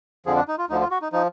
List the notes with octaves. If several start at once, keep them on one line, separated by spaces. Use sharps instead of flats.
F2 D3 F3 G#4
D4
D#4
F4
D2 D3 F3 D#4
F4
F#4
D#4
F3 D#4